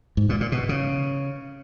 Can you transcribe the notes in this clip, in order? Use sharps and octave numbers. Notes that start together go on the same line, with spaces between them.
G#2
A#2
A#2
B2
C#3